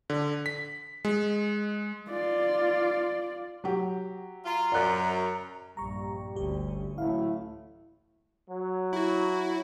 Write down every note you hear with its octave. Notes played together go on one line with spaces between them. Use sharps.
D3
B6
G#3
F4 D5
F#3 G4
F4 A#5
F#2 D5 F#6
A#1 G2 G3 A#5 C#6
G1 D2 C#4 G4
A1 A2 F#3 A3 E4 F5
F#3
E4 F#4